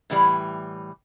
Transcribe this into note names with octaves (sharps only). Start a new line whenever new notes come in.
A2 E3 G3